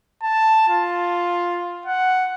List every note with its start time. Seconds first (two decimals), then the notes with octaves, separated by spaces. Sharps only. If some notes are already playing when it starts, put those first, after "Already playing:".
0.23 A5
0.69 F4
1.86 F#5